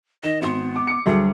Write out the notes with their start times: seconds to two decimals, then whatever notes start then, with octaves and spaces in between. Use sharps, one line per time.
0.23 D#3 D#5 E7
0.42 G#1 B3 C6
0.76 D6
0.87 D6 C#7
1.06 D2 F#3 G3 G#4 A4